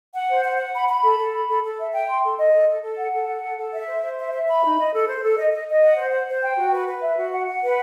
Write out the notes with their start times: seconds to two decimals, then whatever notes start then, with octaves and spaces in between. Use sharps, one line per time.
0.14 F#5
0.29 C5
0.44 F#5
0.58 F#5
0.73 B5
0.88 B5
1.03 A4
1.19 A4
1.33 B5
1.48 A4
1.63 A4
1.79 E5
1.93 G5
2.08 C6
2.24 A4
2.38 D#5
2.54 A4
2.69 A4
2.83 A4
2.98 F#5
3.13 A4
3.28 F#5
3.43 A4
3.58 A4
3.73 E5
3.88 C5
4.02 C5
4.18 E5
4.32 E5
4.47 B5
4.63 D#4
4.78 D#5
4.93 A4
5.08 C5
5.22 A4
5.37 D#5
5.52 D#5
5.68 D#5
5.82 F#5
5.97 C5
6.12 F#5
6.27 C5
6.42 G5
6.57 F#4
6.73 B4
6.87 B4
7.02 E5
7.17 F#4
7.33 F#5
7.47 F#5
7.62 B4